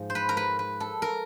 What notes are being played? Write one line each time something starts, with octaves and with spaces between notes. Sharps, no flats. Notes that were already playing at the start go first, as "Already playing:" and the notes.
Already playing: G#2 F3
C5
B4
A#4
B4
B4
A4
A#4